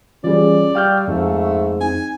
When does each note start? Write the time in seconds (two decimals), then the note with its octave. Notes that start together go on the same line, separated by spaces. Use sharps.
0.24 E3 G3 C#4 F4 G#4 D5
0.75 G3 F5 G5 C#6 E6 F6 G6
1.08 F2 G#2 A3
1.81 C4 D#4 G#5